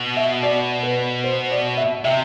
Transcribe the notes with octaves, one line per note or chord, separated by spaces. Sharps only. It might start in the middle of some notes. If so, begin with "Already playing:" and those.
Already playing: B2
E5
D5
B4
C5
D5
E5
C3 E5